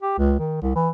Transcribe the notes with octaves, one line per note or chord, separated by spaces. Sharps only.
G4
C#2
D#3
C2
E3